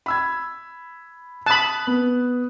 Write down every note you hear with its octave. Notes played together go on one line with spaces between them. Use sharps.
B5 E6 G#6
A5 B5 D#6 F#6
B3